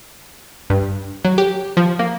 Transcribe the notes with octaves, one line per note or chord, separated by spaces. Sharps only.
G2
F#3
G4
F3
A#3